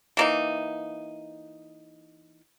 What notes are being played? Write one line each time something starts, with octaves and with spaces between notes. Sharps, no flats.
E3 A#3 D#4